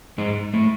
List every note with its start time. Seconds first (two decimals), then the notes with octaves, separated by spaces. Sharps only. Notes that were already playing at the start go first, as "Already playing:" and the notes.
0.18 G#2 G#3
0.54 A2 A3